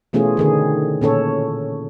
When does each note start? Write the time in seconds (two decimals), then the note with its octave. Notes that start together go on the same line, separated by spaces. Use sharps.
0.13 B2 E3 A3 C#4 F4 G#4
0.37 D3 D#3 G#4
1.01 A#2 C#4 A4 C#5